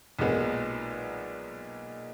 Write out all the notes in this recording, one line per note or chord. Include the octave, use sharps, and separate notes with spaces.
B1 A#2 G#3 B3